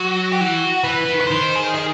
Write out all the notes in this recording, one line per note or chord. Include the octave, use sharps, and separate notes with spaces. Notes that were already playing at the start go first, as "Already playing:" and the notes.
Already playing: F#3 F#4
G4
E3 F#4
E3 B4
E3
D#3
B4
D#3 C5
G#4
G#4